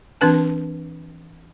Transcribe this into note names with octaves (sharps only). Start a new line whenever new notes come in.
E3 C4 D4 B4 A5